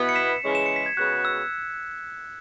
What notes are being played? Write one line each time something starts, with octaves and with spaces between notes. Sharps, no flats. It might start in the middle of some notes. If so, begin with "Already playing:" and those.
Already playing: B2 B3 E4
C#7
B6 E7
C#3 E3 G#3 C#4
E7
C#7
B6
G#6
C#3 G#3 B3 F#4 F#6
E6